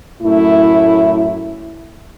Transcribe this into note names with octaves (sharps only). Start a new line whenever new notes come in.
F#2 A2 A3 E4